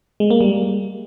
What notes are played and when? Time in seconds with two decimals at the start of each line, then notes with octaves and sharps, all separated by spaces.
0.20 G#3
0.30 A#3
0.41 G3